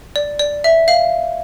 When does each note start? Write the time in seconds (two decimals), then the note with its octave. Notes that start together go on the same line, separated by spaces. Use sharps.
0.16 D5
0.39 D5
0.64 E5
0.88 F5